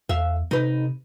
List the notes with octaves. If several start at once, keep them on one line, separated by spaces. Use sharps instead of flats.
E2 E5 F5
C3 D#4 B4